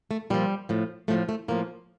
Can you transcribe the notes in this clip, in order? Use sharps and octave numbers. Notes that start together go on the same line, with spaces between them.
A3
A#2 F3 G3
A2 F3
A2 F3 A3
A3
A2 F3 A#3